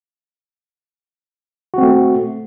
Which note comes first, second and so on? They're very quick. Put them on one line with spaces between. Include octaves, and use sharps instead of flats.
F#4 C4 A3